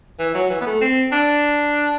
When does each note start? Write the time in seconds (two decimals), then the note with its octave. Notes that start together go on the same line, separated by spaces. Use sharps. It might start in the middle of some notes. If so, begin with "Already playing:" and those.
0.19 E3
0.34 F#3
0.50 E3
0.61 B3
0.66 A3
0.81 C4
1.12 D4